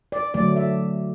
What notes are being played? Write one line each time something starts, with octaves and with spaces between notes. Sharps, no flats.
D5
D3 F#3 A3 D5
E5